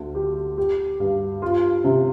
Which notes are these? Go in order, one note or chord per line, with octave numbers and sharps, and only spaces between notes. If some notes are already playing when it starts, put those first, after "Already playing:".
Already playing: D2 D3
G4
G4
G2
F4
C3